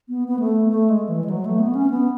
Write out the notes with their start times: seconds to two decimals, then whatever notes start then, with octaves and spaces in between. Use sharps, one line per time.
0.09 B3
0.28 B3
0.39 A3
0.69 A3
0.90 G#3
1.09 E3
1.24 G#3
1.30 F#3
1.45 A3
1.59 B3
1.75 C#4
1.90 B3